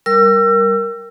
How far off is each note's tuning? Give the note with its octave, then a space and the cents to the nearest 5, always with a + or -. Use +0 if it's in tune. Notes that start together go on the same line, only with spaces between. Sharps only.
G3 +0 A#4 +0 E6 +35